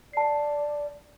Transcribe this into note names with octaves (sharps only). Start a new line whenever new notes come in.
D5 A5 C7